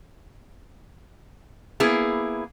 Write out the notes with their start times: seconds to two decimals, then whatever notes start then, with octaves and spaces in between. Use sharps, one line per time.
1.80 A#3 B3 E4 G#4